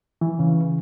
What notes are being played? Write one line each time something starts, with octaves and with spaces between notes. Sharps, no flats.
E3
C#3